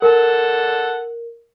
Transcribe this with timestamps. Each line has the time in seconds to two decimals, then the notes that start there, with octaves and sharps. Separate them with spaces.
0.02 A4 A#4 F#5